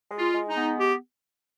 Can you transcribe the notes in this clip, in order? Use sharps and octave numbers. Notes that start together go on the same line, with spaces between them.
G#3
F4
G#3
D#4
B3
G4